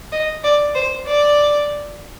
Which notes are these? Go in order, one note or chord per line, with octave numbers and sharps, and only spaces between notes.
D#5
D5
C5
D5